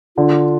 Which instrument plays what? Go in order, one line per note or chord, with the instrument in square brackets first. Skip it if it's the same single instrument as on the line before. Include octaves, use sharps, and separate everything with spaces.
[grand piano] D3 [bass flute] F4